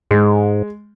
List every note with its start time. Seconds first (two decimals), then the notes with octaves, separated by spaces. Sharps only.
0.11 G#2 G#3